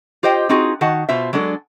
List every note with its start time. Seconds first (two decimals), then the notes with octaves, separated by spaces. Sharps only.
0.23 F4 G4 C5 D#5 G5
0.49 C4 D#4 F4 F#4 G#4
0.81 D#3 F#4 F#5 A5
1.09 B2 F4 C5 E5
1.33 F#3 G#3 D4 A4